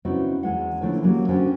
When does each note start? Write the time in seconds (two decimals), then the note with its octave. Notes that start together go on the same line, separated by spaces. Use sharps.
0.05 C#3 B3 C4 D#4 E4 F#4
0.43 E2 G#3 F#5
0.81 D3 E3 F3 A3 A#3 C#4
1.02 C#3 F#3 G3 A#3
1.29 D3 C#4 F#4 C5 G5